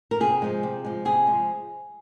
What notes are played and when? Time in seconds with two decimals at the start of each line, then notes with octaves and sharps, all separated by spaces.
0.11 A#4
0.20 C3 G#4
0.42 F3 G#3
0.63 C3
0.85 F3 G#3
1.05 C3 G#4
1.27 F3 G#3